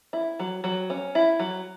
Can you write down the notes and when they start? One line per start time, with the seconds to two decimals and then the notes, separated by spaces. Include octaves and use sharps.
0.13 E4
0.39 F#3
0.64 F#3
0.90 C#4
1.15 E4
1.39 F#3